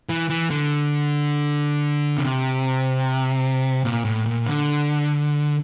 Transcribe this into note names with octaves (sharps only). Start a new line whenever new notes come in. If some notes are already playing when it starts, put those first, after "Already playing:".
E3
E3
D3
C3
A#2
A2
A#2
D3